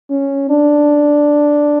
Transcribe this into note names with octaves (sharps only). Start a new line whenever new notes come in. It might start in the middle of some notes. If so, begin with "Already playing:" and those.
C#4
D4